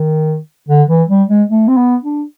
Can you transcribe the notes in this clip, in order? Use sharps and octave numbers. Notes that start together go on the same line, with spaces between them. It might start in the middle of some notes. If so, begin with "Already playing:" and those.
Already playing: D#3
D3
E3
G3
G#3
A3
C4
B3
D4